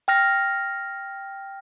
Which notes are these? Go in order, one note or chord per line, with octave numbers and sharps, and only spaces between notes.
G5 F6 A#6